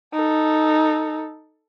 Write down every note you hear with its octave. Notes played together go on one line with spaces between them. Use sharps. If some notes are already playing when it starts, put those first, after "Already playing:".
D#4 A4